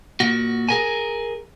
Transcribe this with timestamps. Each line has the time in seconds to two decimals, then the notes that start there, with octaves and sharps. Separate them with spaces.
0.20 A#2 F#4
0.69 G#4 A#4 G#5